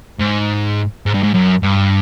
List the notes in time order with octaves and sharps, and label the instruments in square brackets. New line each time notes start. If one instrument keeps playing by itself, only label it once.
[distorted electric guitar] G#2
G#2
G2
G#2
F#2
G2